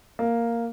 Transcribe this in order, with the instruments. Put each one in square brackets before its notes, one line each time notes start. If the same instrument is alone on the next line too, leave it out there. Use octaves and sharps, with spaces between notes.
[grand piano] A#3